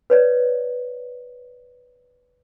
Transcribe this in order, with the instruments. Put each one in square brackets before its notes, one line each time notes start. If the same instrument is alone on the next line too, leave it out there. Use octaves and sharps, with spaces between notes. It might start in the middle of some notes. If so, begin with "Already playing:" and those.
[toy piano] B4 C#5 D5